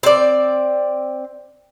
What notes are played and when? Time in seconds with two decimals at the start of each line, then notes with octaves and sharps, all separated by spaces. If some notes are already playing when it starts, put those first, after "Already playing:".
0.03 C4 D5